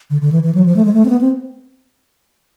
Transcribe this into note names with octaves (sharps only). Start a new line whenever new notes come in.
D3
D3
E3
E3
F#3
F3
A3
G#3
A3
C4
B3
C4